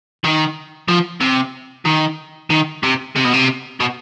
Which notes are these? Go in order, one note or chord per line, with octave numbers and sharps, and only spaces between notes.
D#3
F3
C3
D#3
D#3
C3
C3
B2
C3
B2